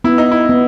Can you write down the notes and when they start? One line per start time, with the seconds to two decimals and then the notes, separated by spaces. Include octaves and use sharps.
0.04 B3 E4
0.18 D#4
0.32 E4
0.49 B3